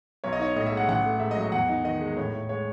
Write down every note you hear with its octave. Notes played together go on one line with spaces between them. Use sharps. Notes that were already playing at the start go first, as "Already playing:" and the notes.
B1 C#5
D#5
D#4 C#5
A2 D#5
E5
G#3
F#5
A1 F#5
A3
G#2 E5
D#5
F#3
D#5
E2 F#5
D#4
D#3 D#5
G#3
A2 C#5
A2
G#3 C#5